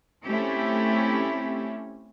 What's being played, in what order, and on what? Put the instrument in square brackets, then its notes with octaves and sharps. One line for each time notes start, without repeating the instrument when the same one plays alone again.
[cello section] A3 C4 C#4 E4 G4